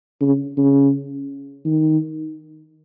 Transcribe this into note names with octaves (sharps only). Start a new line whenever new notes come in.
C#3
C#3
D#3